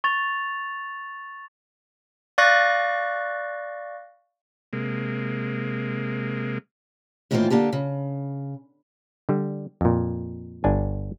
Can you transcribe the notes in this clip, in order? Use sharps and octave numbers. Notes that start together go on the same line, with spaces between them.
C#6 A6 F7
D5 F5 C#6 F#6 A6 A#6
C3 G#3 A#3
A2 D#3 E3 A#3 C4 F4
D3 A#3 G4 A5
C#3
D3 G3
F2 A#2
G1 D4 G#5